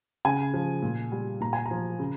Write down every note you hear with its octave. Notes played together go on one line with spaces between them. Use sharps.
C#3 G#5
F3
A#2
G3
A#2 A#5
G#5
A#5
F3
C#3